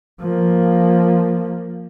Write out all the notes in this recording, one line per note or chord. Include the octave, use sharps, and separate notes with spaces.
F3 A#3